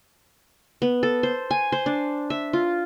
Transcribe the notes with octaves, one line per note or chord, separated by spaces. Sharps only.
B3
A4
C5
G#5
C5
D4
E5
F4